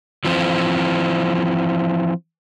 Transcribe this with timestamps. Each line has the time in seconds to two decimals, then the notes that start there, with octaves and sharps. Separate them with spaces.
0.25 E3 F3 C4